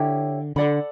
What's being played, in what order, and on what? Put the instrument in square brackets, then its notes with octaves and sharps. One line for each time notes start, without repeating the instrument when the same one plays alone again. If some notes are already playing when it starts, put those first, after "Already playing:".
Already playing: [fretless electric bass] D3 [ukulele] E4 G4 C#5 G5
[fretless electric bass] D3 [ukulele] A4 D5 F#5 B5